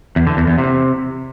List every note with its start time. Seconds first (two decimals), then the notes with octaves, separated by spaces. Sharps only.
0.16 E2
0.27 D3
0.37 E2
0.47 E2
0.58 C3